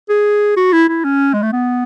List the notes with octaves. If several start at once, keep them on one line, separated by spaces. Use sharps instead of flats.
G#4
F#4
E4
E4
C#4
G#3
A3
B3